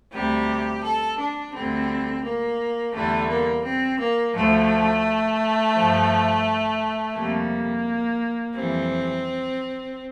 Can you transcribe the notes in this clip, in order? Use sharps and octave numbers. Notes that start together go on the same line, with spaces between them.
D2 C3 G3 G4
A4
D4
D2 D3 G3 C4
A#3
E2 D3 G3 A3
A#3
C4
A#3
D2 D3 F3 A3
G2 F3
F2 C3 G3 A#3
F2 E3 G3 C4